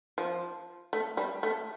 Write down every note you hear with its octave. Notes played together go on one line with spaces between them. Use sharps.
F3
A3
G3
A3